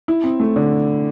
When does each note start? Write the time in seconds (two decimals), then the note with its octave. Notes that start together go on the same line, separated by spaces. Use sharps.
0.08 E4
0.24 C4
0.40 A3
0.56 D3